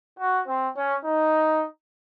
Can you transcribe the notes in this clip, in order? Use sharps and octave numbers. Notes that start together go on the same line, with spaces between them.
F#4
C4
C#4
D#4